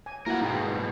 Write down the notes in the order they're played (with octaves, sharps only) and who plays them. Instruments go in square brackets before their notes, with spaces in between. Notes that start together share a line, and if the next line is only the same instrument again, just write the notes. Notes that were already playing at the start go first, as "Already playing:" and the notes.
[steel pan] G#5
[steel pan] A#3 E4 F#4 [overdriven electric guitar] A#4 F#5
[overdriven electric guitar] G#2 B2 [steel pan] D#4 G5